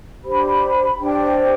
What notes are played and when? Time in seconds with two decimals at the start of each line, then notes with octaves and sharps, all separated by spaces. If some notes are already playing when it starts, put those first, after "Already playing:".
0.23 D4 G4 C5 B5
0.99 D4 G4 C5 G5